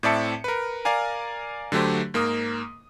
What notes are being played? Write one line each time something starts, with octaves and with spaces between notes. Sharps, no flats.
A2 C4 D5 E5 A5 C#7
A#4 B4
A#4 D5 F5 G#5 A#5
D3 F#3 A3 G4 C5
G#2 A#3 A#4 D#6